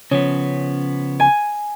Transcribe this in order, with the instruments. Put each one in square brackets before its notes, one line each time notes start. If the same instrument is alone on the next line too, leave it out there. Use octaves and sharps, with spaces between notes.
[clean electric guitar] C#3 F3 B3 [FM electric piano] C#4
[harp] G#5